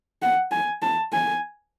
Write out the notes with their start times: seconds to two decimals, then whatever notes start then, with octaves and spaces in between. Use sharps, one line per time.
0.22 F#5
0.51 G#5
0.82 A5
1.13 G#5